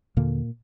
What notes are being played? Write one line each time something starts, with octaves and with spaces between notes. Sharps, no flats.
D#2 A#2 D3 A#3